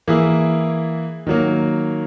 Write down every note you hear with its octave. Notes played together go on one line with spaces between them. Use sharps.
E3 A#3 E4 G#4
D#3 F#3 A#3